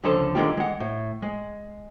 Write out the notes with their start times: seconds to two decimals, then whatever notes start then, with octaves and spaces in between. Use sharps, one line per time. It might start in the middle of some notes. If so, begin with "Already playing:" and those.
0.03 C#2 D3 F3 A4 A5 C6
0.35 D3 D#3 G#3 C4 F4 G4
0.57 G#3 F#5
0.80 A2
1.22 G#3